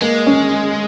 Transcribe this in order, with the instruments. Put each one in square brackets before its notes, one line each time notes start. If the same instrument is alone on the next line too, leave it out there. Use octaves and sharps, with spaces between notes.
[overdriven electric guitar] G#3 [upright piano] A#3
[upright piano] C#4